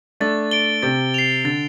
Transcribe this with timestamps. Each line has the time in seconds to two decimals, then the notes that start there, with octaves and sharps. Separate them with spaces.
0.20 A3 D4 A6
0.51 D7 G7
0.83 C3 A6
1.14 C7 F7
1.44 D3 A6